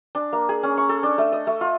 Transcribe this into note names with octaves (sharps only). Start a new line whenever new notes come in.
D4
A#3
G#4
C#4
C#6
A4
D4
A3
D#5
A3
F4